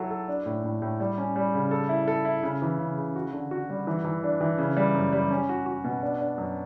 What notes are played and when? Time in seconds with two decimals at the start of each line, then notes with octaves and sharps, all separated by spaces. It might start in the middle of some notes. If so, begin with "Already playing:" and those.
Already playing: F#3 E4 A4
0.10 A4
0.28 D4
0.46 A2
0.64 A2
0.82 A2
1.00 G3
1.18 C#4
1.36 G3
1.54 C#3
1.71 A4
1.89 E4
2.08 A4
2.25 E4
2.43 C#3
2.62 E3
2.79 C#3
2.98 C#3
3.16 F#4
3.33 D3
3.51 F#4
3.70 G3
3.87 E3
4.04 E3
4.23 D4
4.41 E3
4.58 C#3
4.77 G3
4.95 F#2
5.13 G3
5.31 C#4
5.49 F#4
5.66 F#4
5.84 B2
6.02 D4
6.21 D4
6.38 F#2